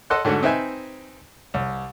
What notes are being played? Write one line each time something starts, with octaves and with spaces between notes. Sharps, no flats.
A4 D#5 F#5 C6 F#6
G#2 D3 A3 F#4
C4 D#4 B4 E5 G#5
C2